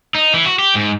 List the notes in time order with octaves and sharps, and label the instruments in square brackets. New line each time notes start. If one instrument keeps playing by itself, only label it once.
[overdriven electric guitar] D#4
E3
F#4
G4
G#2